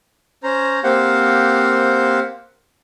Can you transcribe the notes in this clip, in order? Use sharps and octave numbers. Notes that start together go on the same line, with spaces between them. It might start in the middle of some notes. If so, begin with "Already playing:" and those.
C#4 C5 A#5
A#3 C4 G4 C5 F5 F#5